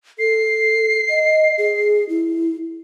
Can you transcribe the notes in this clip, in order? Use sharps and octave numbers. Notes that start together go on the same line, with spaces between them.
A4 C7
D#5
G#4
E4